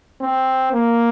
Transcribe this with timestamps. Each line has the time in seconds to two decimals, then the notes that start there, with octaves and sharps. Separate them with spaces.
0.21 C4
0.73 A#3